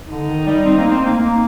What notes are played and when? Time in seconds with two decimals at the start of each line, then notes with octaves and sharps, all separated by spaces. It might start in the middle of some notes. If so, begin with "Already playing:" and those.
0.11 D3 D#4
0.29 D#3
0.47 G3
0.65 C4
0.78 A#3
0.91 C4
1.05 A#3
1.19 A#3